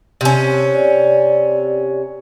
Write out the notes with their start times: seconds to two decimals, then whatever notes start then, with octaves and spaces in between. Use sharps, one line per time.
0.21 C3 C#4
0.72 D5